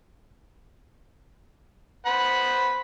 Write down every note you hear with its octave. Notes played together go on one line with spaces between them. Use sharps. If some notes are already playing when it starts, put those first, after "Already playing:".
C5 F#5 B5